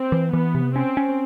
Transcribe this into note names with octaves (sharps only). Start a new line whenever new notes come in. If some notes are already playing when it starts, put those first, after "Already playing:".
Already playing: C4
E3
E3 B3
C3
C4 C#4
C#4